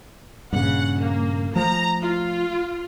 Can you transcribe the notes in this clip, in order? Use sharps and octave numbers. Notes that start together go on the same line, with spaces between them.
G2 A#2 C#3 F#5
A#3
F3 A3 A#5
F4